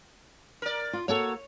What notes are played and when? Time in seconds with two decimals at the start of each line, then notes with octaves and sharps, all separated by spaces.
0.62 A#4 D5
0.93 F4
1.08 A#3 F#4 A4 C#5